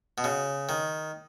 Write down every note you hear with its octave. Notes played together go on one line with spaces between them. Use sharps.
B2
C#3
D#3